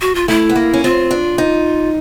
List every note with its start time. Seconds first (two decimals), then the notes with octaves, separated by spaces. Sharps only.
0.01 F#4
0.15 F4
0.28 A3 E4
0.49 B3
0.56 A#3
0.73 C#4
0.84 C4 F4
1.11 D4
1.38 D#4